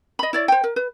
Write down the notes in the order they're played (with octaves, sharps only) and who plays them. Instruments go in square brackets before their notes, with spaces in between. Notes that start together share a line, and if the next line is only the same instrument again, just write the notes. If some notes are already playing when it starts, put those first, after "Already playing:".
[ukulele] D#5 B5
E4 C#5 D5
C5 G5
A#4
B4